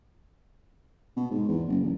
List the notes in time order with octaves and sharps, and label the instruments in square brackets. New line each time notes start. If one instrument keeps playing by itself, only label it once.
[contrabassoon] B2
G#2
E2
F#1
A1